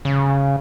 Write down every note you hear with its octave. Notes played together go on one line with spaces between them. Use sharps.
C#3